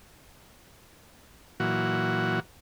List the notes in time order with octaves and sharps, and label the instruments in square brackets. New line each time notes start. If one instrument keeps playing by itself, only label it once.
[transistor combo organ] A#2 E3 F#3 F#4